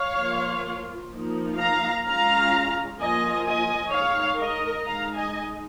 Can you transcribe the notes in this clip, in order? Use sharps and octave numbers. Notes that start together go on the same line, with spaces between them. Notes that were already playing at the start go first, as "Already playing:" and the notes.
Already playing: C#5 F5
F3 A#3 F4
F3 A#3 D#4
F5 A#5
G#3 C#4 F4 F5 A#5
F3 A#3 F4 D#5 G#5
D#5 G#5
G#3 D#4 C#5 F5
A#4 D#5
G#3 D#4 F5 A#5
D#5 G#5